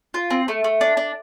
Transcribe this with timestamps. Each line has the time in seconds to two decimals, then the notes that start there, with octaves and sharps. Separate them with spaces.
0.14 F4
0.30 C4
0.48 A3
0.64 A3
0.81 D4
0.97 D4